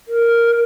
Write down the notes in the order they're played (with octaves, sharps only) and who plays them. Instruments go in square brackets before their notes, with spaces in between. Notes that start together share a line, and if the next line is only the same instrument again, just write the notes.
[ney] A#4